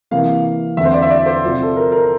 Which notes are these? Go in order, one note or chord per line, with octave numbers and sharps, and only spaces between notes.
C3 E3 A#3 F5
E2 D3 A3 C4 E5
C5
D5
E5
D5
C5
C3 F3 C4
A4
A#4
A#4